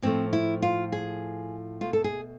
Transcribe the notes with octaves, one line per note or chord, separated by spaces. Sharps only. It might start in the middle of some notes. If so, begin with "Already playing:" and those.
A2 F3 A3 C4
E4
F4
G#4
B2 A3 F4
A4
G#4